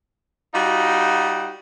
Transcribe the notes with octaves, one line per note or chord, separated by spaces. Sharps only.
G3 D#4 F4 F#4